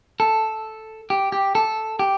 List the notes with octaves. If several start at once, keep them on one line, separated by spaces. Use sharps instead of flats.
A4
G4
G4
A4
G4